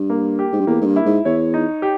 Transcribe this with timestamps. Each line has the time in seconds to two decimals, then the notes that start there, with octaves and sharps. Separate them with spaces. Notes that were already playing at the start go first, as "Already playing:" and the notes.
Already playing: G2
0.10 A#3
0.39 G4
0.53 G#2
0.60 G2
0.67 E2 A#3
0.81 G#2
0.86 G2
0.96 E4
1.06 G#2
1.25 E2 C#5
1.54 D#4
1.82 G4